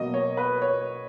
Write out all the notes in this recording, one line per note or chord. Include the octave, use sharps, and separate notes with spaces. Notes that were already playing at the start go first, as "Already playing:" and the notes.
Already playing: B2 F#3 A#3 D#5
C#5
B4
C#5